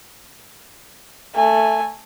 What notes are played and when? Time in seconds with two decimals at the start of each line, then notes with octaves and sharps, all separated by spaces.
1.35 A3 G#5